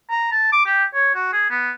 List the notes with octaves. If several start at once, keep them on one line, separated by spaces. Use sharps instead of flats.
A#5
A5
D6
G4
C#5
F#4
G#4
B3